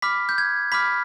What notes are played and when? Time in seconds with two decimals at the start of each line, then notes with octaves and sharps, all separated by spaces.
0.02 B5 D6 F6 B6
0.29 G6
0.38 G#6
0.72 B5 D6 F6 B6